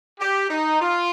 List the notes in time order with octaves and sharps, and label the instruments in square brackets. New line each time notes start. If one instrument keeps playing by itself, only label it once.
[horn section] G4
D#4
F4